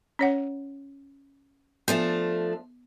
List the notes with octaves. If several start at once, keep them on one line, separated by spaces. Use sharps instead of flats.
C#4 C#5 F#5
F3 A3 B3 D4